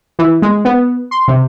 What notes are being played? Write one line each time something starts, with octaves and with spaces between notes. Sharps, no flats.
E3
G#3
B3
C6
C3